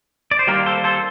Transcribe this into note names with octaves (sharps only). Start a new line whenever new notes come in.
D5
C5
D#3 G3 A#3 G4 A#4
A4 C5
A4 C5